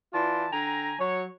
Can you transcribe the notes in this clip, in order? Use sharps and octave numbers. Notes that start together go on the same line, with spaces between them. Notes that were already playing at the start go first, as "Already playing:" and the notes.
E3 F4 D5 A5 C6
D3 G5 G#5 A#5
F#3 C#5